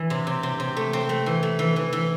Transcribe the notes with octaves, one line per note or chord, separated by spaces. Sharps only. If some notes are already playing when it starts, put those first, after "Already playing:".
Already playing: E3
C3
C3
C3
C3
A3
C4
A3
E3
A3
E3
E3
E3